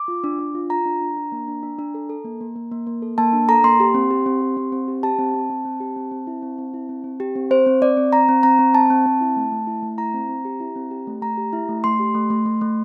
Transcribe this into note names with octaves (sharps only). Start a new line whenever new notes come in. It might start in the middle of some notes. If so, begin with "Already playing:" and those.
Already playing: D6
F4
D4
D4
F4
F4 A#5
D4
D4
D4
A#3
D4
D4
D4
A4
A4
A#3
A#3
A#3
A#3
A#3
A4
A#3 A5
D4
A4 A#5
A#3 C6
G4
C4
G4
C4
G4
C4
C4
G4
G4 A5
C4
C4
C4
C4
G4
C4
C4
E4
C4
C4
E4
C4
C4
G4
C4
C4 C5
C4
C4 D5
C4
C4 A#5
C4
C4 A#5
C4
C4 A5
C4
C4
E4
A3
A3
E4
A3
E4 A#5
C4
C4
G4
E4
C4
G4
A3
A3 A#5
G4
E4
A3
A3 C6
G4
A3
A3
A3
A3